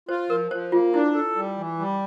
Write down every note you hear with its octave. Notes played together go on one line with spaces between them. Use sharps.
F4 C5
F3 A#4
F3 C5
A#3 F4
D4 E4
A4
G3
E3
G3